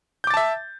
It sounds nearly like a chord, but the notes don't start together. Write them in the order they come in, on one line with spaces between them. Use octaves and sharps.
G6 D6 A6 A5 E5